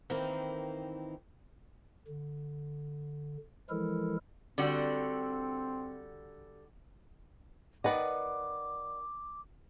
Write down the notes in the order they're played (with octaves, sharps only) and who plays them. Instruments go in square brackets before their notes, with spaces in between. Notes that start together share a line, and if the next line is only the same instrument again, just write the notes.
[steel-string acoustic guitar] D#3 E3 A#3 C4 D#4 E4
[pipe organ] D3
E3 F3 G#3 E4 A4 A#4
[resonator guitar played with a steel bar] D3 G3 F#4 [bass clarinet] C4
[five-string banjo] D#3 B4 D#5 [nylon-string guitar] D5 F#5 [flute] D6